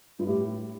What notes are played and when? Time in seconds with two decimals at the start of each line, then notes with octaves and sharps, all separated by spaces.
0.19 G2 F4
0.27 A2 G4